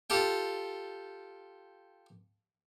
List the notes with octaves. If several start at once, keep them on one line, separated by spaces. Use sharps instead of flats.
F4 G4 A4 G5